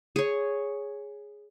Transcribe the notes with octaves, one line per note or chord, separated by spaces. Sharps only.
G#4 C#5